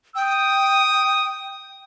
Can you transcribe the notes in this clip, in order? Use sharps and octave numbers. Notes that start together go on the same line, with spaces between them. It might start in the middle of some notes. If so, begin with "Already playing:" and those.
G5 D#6